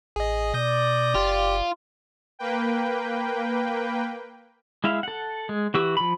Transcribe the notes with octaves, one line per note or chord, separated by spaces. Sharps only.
A1 G#4 D#5
B2 D5 D#6 G6 A#6
F#1 F4 G4
A#3 B4 G5
G#3 E4 E5 F5
A4 F#5
G#3
E3 F#4 G4 E6
F3 B5